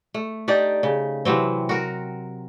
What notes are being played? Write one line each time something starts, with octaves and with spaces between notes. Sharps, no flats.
A3
D4 D#4 G4 D5
C#3
C3 E3 F#3 C4
F#4 A#4